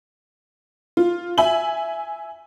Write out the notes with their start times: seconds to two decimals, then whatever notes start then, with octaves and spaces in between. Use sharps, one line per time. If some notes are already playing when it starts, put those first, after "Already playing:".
0.97 F4
1.38 E5 G#5 F#7